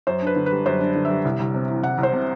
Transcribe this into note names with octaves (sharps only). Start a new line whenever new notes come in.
F#2 C5
D4 B4
D3
B4
G3
F#2 C5
D4
D3
E5
G3
C2
C2
C3
E3
C2 F#5
C2
C5
C3